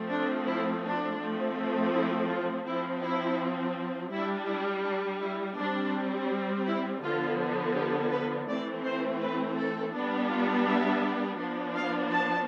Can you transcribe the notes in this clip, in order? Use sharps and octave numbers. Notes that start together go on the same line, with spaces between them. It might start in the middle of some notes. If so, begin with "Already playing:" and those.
Already playing: F3 A3 C4
D4
E4
D4
F3 A3 C4
E4
F4
F3 C4 E4
E4
G3 D4 E4
E4
D4
E4
G3 C4 D4
E4
D3 F3 B3 F4
G4
B4
E3 A3 C4 D5
C5
B4
A4
G3 B3 D4
F4
E5
F3 B3 D4
F5
A5